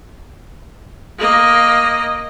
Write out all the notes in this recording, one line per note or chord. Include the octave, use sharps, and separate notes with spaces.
A#3 D#5